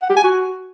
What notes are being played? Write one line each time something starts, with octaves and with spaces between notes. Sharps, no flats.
F#5
G4
G#5
F#4